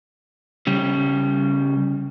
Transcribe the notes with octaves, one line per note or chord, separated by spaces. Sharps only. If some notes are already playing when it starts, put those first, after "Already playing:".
C#3 G3